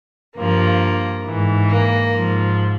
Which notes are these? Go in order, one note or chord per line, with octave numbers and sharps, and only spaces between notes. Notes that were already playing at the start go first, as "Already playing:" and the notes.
G2 F3 A#3
G#2 E3
A#3
G#2 F3